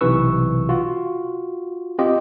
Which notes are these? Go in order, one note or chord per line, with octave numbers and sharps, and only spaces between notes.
B1 C3 E3 B4 C#6 E6
F4 F#4
C4 F4 G4 D#5